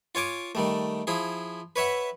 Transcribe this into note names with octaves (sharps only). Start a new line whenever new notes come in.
F4 C#5 G#5 D6
D#3 G3 A3
F3 E4 G#4
B4 C#5 E5 F#5